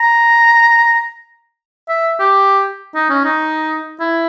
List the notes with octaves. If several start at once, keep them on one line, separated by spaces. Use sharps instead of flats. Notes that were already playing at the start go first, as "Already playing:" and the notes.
Already playing: A#5
E5
G4
D#4
C#4
D#4
E4